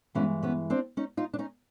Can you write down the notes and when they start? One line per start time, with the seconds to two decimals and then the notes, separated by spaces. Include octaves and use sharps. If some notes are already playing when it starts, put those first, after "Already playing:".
0.15 G2 E3 G#3 B3 C#4
0.42 B3 C#4
0.70 C4 D4
0.97 C#4 D#4
1.17 D#4 F4
1.33 D4
1.38 C#4 D#4